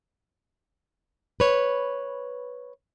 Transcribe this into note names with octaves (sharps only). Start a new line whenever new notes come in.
B4 C#5